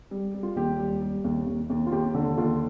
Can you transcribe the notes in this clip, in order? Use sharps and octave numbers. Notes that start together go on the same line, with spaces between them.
G3
G3
F4
D#2 G4
G3
G3
D#2
D#2
D#2
F4
D#2 G4
D3
D#2 F4